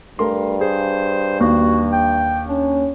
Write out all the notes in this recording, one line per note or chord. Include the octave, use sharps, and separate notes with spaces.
G2 A3 A#4 C6
G#4 C5
D#2 F#4
G5
C#4 D4